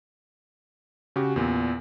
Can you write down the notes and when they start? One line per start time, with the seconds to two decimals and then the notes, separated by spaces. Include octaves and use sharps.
1.16 C#3 F#4 G4
1.36 E2 A#2